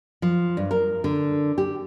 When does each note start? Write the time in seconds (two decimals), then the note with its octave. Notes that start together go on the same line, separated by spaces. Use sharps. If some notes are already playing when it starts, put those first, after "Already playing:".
0.22 F3
0.57 G2
0.71 A#4
1.04 D3
1.58 G4